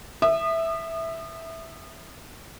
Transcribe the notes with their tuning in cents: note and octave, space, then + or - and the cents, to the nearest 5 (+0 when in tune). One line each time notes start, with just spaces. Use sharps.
E5 -5 D#6 -35